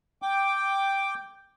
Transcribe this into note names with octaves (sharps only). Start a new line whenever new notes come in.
G5 D6